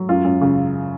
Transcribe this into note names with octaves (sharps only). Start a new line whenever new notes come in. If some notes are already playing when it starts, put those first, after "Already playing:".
Already playing: F#3
F#2 F4
F#2
C#3